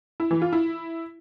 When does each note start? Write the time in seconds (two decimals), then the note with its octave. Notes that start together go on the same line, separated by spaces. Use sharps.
0.20 E4
0.31 E3
0.42 F4
0.53 E4